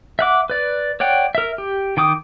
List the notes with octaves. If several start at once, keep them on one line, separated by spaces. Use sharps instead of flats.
E5 F#5 D6
B4 D5
C#5 D5 F#5 G5
A#4 E5
G4
D#3 G5 D6 D#6